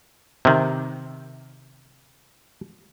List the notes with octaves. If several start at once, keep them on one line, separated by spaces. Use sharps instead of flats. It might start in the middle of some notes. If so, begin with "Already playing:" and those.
C3 D#3